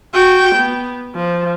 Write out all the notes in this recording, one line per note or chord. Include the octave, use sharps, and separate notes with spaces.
F#4 G5
B3
F3